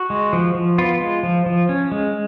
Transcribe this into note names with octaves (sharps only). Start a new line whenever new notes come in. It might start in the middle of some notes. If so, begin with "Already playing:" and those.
Already playing: F#4
G#3
F3
F3
B3 F4
G#3
F3
F3
C#4
G#3